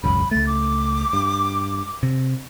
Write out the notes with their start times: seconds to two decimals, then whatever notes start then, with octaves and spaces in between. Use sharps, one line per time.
0.04 E1 C#2 F#2 B5
0.31 C#2 A3 A6
0.47 D6
1.13 G2
2.03 C3